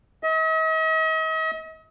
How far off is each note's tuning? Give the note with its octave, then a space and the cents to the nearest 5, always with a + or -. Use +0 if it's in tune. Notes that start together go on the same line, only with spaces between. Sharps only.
D#5 +45